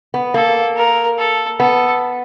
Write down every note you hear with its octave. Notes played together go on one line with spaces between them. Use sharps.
B3
A#3 A4
A#4
A4
B3 A4